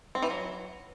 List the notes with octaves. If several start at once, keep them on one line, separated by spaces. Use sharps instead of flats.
C4
E3
F#3